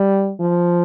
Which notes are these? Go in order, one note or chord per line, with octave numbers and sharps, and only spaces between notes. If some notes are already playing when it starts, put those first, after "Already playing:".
Already playing: G3
F3